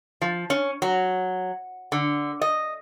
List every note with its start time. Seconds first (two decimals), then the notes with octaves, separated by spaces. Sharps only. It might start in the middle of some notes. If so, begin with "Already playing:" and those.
0.22 F3
0.50 C#4
0.82 F#3
1.92 D3
2.41 D#5